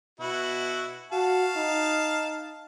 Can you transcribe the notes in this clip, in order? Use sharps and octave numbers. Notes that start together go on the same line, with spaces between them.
B2 E4 F#4
F#4 F5 A5
D#4